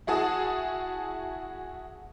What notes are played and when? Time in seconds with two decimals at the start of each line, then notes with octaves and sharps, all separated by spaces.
0.07 E4 F#4 G#4 A5 D#6